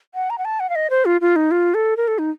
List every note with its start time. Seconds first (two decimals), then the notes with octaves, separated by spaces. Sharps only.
0.15 F#5
0.30 A#5
0.38 F#5
0.45 A5
0.60 F#5
0.70 F5
0.75 D#5
0.90 C5
1.05 F4
1.21 F4
1.36 D#4
1.51 F4
1.74 A4
1.97 A#4
2.08 A4
2.18 D#4